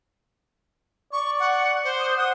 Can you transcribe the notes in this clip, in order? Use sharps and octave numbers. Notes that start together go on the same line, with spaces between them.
D5 C#6
F#5
C5
D#6
F#5 D#6